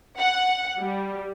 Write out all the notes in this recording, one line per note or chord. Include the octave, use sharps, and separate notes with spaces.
F#5
G3